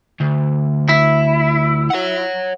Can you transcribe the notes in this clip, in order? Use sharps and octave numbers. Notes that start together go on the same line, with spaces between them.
D2
E4
C#5 F#5